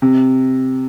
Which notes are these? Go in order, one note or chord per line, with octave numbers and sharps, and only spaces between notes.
C3